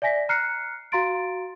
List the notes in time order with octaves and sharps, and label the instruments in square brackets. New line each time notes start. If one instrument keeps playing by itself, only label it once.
[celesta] D5 E5 G#5 A#6 B6
A#5 F6 F#6 C7 C#7
F#4 F5 A#5 C6 A6 D7